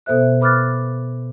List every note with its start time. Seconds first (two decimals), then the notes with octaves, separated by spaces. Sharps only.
0.06 B2 B3 A4 C5 E5 F#6
0.41 B4 B5 D6 F6 F#6 A6